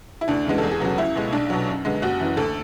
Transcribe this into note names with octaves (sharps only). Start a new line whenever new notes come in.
E4
D2 D4
C#3 E3 G#3 B3
E2 A4
G#4
C#3 F#3 B3 F#4
C#2 E4
B2 G#3
B1 D4
B2 F#3
F#2
D3 G#3 B3
F#1 F#4
F#2 E3
D2 A4